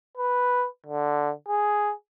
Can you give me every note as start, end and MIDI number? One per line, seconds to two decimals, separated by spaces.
0.17 0.66 71
0.87 1.32 50
1.48 1.93 68